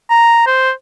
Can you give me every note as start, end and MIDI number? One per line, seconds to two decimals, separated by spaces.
0.10 0.42 82
0.47 0.71 72